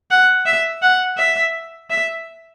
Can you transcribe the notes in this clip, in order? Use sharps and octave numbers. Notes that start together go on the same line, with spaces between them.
F#5
E5
F#5
E5
E5